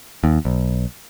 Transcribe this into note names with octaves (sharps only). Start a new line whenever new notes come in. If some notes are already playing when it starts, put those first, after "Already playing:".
D#2
B1